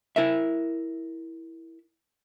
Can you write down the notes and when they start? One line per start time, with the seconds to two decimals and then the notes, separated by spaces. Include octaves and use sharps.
0.16 E4 A#4 E5